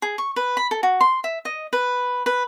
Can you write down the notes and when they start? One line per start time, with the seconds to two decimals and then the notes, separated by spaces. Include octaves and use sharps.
0.02 G#4
0.18 C#6
0.36 B4
0.57 B5
0.71 A4
0.83 F#4
1.01 C6
1.24 E5
1.45 D#5
1.73 B4
2.26 B4